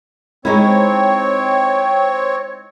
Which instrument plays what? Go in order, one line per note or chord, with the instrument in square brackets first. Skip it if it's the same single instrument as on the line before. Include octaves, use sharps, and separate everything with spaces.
[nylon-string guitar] G#3 D#4 E4 [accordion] C4 C#5